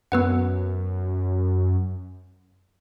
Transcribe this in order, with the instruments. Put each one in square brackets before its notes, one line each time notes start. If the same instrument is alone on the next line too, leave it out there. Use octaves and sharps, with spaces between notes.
[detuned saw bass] F#2 [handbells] B3 B4 F#5